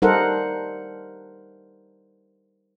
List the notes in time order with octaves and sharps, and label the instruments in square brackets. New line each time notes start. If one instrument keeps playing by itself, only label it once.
[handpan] G3 D#4 A4 A#4 C5 F#5